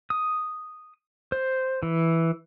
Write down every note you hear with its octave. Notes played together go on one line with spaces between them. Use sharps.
D#6
C5
E3